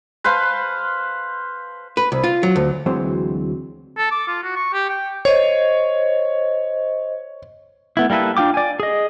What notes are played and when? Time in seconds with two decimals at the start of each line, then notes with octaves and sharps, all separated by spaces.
0.24 B4 C5 F5 A5
1.97 B4
2.12 C2
2.24 F4
2.43 F#3
2.56 D2
2.86 D2 E3 F#3 G#3 C4
3.98 A4
4.11 D6
4.28 F4
4.43 F#4
4.56 C#6
4.73 G4
4.90 G5
5.25 C5 C#5 D#5
7.97 A3 B3 E4
8.10 G3 A#3 E4 A4 B4
8.37 D4 F4 G5 D6
8.54 D5 G#5
8.80 G#4 D#5